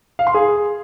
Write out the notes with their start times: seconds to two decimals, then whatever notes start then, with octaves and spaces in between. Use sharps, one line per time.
0.19 F5
0.27 C6
0.34 G#4